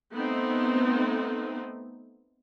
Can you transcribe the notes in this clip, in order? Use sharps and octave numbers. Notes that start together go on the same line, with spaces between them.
A3 B3 C4 D#4